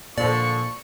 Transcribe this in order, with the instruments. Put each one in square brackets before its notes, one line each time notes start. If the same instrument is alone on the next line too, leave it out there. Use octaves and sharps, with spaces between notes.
[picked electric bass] A#2 [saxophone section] D3 F3 [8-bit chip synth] D5 [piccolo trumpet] C#6